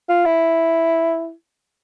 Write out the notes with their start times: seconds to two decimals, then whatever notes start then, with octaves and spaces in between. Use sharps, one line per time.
0.09 F4
0.25 E4